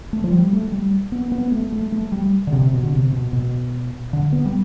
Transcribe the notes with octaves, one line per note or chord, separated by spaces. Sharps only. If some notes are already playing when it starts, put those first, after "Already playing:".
A3
F3
G3
A3
G3
B3
B3
A3
A3
A3
G3
D3
C3
B2
D3
C3
B2
B2
D3
B3
G3